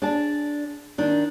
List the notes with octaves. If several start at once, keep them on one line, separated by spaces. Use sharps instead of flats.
D4 G#4 D5 A5
D#3 D4